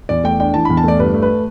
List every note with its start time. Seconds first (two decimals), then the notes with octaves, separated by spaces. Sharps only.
0.09 E2 D5
0.24 A3 G5
0.40 D4 G5
0.54 E3 A5
0.65 E2 B5
0.77 A5
0.84 A3 D5
0.99 G2 B4
1.14 A3
1.22 B4